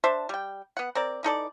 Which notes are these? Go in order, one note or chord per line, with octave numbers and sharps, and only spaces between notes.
D4 C5 E5 A5
G3 G5
B3 F#5
C4 A#4 D5
E3 D#4 A4 D5